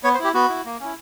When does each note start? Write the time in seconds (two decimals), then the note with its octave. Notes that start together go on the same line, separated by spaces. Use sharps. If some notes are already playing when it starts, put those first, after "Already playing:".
0.04 B3 C#5
0.14 C5
0.19 E4 G4
0.34 B3 F#4
0.49 E4
0.65 A#3
0.80 C#4 E4